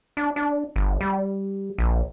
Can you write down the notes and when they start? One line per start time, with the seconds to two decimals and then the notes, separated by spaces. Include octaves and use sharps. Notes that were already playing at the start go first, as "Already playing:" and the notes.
0.17 D4
0.36 D4
0.76 G1
1.01 G3
1.78 A#1